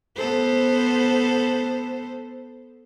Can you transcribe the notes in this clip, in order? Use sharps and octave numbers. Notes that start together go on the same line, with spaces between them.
B3 A4 C5